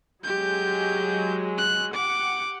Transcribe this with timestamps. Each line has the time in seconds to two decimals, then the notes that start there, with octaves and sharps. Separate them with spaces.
0.24 F#3 G#3 G4 G6
1.58 F#6
1.93 G4 F#5 D6